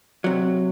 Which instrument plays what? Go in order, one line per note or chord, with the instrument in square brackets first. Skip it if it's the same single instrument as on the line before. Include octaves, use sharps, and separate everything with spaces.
[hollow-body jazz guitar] C3 F#3